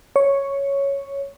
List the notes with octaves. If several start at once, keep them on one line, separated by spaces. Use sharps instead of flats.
C#5